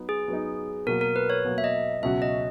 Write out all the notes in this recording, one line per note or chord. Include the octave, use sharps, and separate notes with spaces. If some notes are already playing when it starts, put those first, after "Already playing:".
Already playing: F#3 B3 D#4
G#4
F#3 B3 D#4
B2 F#3 A#3 A#4
A#4
B4
C#5
B2 F#3 A#3
E5
D#5
C#2 B2 F#3 C#4 F#4 E5
D#5